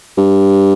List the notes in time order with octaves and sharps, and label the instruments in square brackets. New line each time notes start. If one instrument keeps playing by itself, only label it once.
[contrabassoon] G2